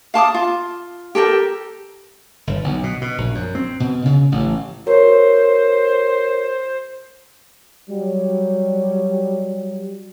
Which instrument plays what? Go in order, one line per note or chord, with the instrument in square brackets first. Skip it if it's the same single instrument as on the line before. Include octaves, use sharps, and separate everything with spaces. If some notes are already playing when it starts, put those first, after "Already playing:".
[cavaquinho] F5 A5 D6 D#6
F4
G4 A4 A#4 G5
[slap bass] G1
B1
B2
B2
A#1
F#2
C4
B2
C#3
A1
[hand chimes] F#4 A#4 C#5 [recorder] C5
[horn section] F#3 G3